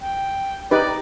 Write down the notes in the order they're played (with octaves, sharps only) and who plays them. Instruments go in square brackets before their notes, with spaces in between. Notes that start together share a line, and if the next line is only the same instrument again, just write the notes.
[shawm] G5
[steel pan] D#4 G4 B4 [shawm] D5